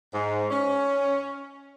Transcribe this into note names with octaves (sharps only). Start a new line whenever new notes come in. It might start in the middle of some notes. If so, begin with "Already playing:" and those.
G#2
C#4